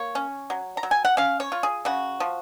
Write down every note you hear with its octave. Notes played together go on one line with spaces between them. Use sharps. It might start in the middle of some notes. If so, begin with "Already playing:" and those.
Already playing: A#3 C#5
C#4
F#3
A#5
F#3
G#5
F#5
C#4 F5
C#5
F4
G#4
C#3 F#4
F3